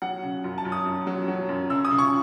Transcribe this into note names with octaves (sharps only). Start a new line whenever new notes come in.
F#3 F#5
C#3
F#2
A5
F#2
D#6
F#2
F#3
F#3
F#2
C#3 E6
D#6
C#3
C#6